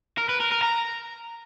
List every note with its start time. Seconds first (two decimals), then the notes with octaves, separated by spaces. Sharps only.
0.18 A#4
0.29 B4
0.40 A#4
0.51 A#4
0.62 A#5